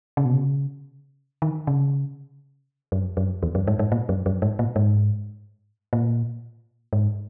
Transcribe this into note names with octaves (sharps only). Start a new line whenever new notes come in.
C#3
B2
C#3
D#3
C#3
F#2
F#2
E2
F#2
G#2
G#2
A#2
F#2
F#2
G#2
A#2
G#2
A#2
G#2